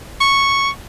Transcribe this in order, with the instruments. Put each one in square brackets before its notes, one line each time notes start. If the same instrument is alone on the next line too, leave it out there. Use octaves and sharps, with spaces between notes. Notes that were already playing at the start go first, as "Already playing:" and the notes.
[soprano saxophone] C#6